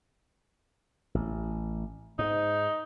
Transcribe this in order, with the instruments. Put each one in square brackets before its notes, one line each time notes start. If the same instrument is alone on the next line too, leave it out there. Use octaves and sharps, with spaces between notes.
[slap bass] A1
[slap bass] G#2 [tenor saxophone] D#4